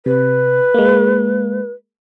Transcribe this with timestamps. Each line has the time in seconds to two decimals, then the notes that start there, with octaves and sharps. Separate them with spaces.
0.06 C3 B4
0.74 G#3 A#3